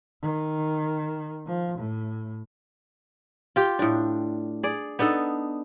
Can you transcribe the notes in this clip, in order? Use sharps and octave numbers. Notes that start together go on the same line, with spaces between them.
D#3
F3
A2
F4 G4
A2 D4
G#4 D5
B3 D4 D#4 A4